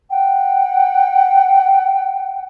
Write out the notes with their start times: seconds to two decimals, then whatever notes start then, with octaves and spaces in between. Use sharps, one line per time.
0.10 F#5 G5